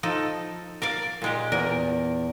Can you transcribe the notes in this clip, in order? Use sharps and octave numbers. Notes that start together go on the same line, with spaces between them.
F3 D#4 A4
A#4 D5 F5
A#2 G#3 G4
E2 A#4